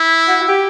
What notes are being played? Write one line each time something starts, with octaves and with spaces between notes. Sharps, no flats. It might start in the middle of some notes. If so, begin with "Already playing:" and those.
Already playing: E4
F#4
F#4
G4